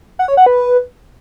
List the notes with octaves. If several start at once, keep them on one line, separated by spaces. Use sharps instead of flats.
F#5
C#5
F#5
B4